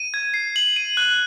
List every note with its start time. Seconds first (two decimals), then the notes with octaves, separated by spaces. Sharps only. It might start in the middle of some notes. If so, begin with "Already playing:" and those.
Already playing: D#7
0.14 G#6
0.34 C7
0.56 F#7
0.76 D#7
0.97 F#6